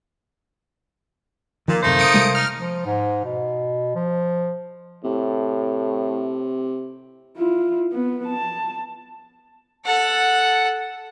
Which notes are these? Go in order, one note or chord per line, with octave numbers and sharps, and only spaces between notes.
A#2 D#3 F3
D1 F#2 C3 A3 A#3 D#4 C5
D#6 C#7 D7
C3 G3 G#3
D#4 F6
F3
G#2
B2
F3
A2 C3
E4 F4
B3
A5
A4 F#5